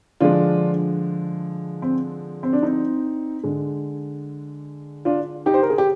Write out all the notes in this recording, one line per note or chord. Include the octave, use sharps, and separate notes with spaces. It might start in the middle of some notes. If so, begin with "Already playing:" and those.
D3 F3 G#3 D4 F4
C4
C4
D4
C4 D#4
D3 G#3
D4 F4
D#4 G4
C5
A#4
G#4
G4